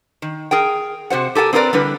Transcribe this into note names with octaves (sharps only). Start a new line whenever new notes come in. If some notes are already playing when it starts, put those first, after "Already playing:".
D#3
G#4 A#4 G5
C3 F#4 C5 F#5
G4 A4 A#4 F#5 G#5
C4 D#4 F4 A#4 B4 D5
D3 G3 E4 B4